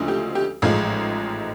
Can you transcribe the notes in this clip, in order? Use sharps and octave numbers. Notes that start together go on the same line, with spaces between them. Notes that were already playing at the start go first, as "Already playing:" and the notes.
Already playing: D2 C#3 F3 G#3
G4
G4
A1 G#2 F3 G#3 F4